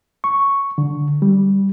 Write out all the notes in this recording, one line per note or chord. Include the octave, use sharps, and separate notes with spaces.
C#6
D3
G3